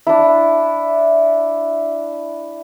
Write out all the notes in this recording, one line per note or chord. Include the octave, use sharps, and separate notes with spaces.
D4 E4